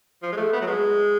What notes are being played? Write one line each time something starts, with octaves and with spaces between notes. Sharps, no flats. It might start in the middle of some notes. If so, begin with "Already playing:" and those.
F3
G#3
A3
B3
F#3
G#3